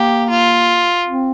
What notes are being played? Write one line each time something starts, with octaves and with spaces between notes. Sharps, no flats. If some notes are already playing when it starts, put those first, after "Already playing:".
Already playing: A#3 G4
F4
C4